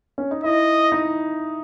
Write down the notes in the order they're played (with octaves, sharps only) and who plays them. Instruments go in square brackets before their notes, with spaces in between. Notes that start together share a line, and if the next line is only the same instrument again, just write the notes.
[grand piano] C#4
D#4
[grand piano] E4 [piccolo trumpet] D#5
[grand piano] D#4